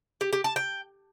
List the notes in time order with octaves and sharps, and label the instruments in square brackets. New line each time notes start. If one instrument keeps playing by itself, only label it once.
[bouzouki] G4
G4
A5
G5